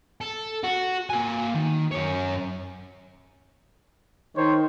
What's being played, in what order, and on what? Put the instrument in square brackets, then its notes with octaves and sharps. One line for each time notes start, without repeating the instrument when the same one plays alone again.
[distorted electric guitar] A4
F#4
A#3 G#5
D#3
F#2 C#5
[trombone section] D#3 [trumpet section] C5 C#5